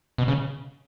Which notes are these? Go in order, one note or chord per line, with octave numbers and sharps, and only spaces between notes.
B2
C#3